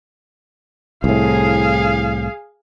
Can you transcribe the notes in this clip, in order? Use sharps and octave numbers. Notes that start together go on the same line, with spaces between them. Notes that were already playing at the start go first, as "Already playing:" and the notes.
C2 A2 G#4 F5